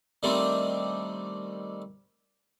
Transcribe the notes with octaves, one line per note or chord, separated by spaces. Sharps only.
D#3 G3 A3 C4 D4